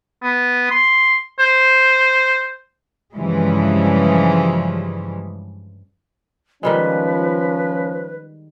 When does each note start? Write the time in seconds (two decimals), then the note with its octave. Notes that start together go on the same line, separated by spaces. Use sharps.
0.23 B3
0.71 C6
1.39 C5
3.14 G2 C#3 E3 F3 G3 G#3
6.63 D#3 F3 G3 G#3 C#4 B4